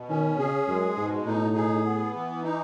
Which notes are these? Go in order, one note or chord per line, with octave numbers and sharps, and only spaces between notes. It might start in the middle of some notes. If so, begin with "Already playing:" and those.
Already playing: B2
D#3 C#4
C#3 G#4
F#2 G#3
G#2 B2
A2 D#4
G#4
B3
E3
D#4